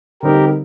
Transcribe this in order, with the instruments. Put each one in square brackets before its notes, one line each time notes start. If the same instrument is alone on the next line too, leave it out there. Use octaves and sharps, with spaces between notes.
[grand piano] D3 G3 C4 D#4 [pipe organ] G4 A#4